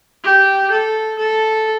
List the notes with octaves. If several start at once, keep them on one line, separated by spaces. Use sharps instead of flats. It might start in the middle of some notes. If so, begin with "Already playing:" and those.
G4
A4
A4